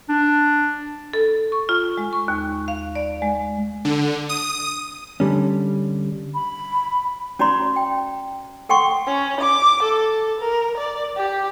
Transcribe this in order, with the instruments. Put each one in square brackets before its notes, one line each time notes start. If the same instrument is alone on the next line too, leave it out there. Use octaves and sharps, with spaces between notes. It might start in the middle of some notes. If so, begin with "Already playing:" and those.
[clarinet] D4
[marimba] A4
C#6
F4
G#3
C#6
D#2
F5
D5
G#3
[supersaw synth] D3
D#6
[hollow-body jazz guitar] D3 G3 C#4
[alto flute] B5
[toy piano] C#4 F#4 D5 A#5 C6
G5
A4 F#5 G5 C6 C#6
[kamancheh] C#4
D6
A4
A#4
D5
G4